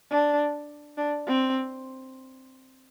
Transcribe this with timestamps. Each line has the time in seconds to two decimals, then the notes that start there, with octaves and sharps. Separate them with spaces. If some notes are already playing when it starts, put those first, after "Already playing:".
0.10 D4
0.97 D4
1.27 C4